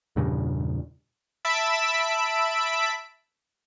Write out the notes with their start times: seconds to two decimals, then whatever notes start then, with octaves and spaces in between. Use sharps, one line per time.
0.16 E2 G2 A#2 C#3
1.45 E5 A5 B5 E6 B6 D7